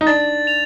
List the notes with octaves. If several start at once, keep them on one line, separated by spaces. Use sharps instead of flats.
D#4
D4 A6
F7